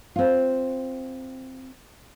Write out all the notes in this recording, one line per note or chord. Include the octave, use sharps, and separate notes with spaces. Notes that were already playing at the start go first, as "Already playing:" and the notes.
C4 F4